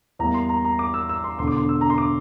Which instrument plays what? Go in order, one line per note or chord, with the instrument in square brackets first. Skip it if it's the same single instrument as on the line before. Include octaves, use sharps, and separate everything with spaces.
[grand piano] E2 E3 G3 A#3 A#5
C6
A#5
A#5
D6
E6
E6
C6
E1 E2 D3 C6
D6
C6
E6
A#5
C6
D6